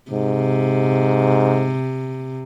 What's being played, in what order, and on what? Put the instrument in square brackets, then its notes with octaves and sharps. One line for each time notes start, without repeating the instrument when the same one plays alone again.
[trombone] G#2 [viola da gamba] C3